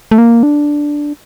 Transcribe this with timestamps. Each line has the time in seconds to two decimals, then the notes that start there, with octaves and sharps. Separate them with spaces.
0.11 A3
0.18 A#3
0.43 D4